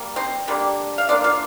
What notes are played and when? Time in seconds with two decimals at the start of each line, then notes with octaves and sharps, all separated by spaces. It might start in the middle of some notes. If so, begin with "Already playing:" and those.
Already playing: G3 A#3
0.16 C4 C5
0.48 D3 G3 A#3
0.98 F5
1.09 D3 F3 A#3 D4 D5
1.24 F4 F5